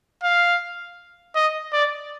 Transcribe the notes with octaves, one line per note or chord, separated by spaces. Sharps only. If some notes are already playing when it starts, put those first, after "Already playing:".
F5
D#5
D5